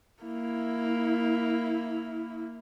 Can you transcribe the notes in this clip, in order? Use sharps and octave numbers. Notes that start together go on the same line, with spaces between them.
A#3 E4